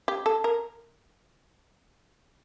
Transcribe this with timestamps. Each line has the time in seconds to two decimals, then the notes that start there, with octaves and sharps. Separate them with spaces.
0.08 G4
0.26 A4
0.44 A#4